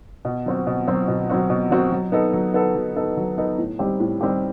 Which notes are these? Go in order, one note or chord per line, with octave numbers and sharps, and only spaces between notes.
B2
F#3 C4 F#4
B2
F#3 C4 F#4
B2
F#3 C4 F#4
B2
F#3 C4 F#4
F#3
B3 D#4 A4
F#3
B3 D#4 A4
F#3
B3 D#4 A4
F#3
B3 D#4 A4
A2
G3 C4 D#4 G4
A2
G3 C4 D#4 G4